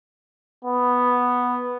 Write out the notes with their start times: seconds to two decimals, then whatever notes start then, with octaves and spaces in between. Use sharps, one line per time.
0.65 B3